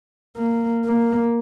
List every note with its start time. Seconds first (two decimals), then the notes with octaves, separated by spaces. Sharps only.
0.37 A#3
0.85 A#3